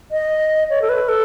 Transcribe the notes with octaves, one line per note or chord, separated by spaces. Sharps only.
D#5
C#5
A4
B4
A4